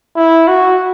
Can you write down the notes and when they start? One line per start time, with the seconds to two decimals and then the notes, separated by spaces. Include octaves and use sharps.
0.16 E4
0.48 F#4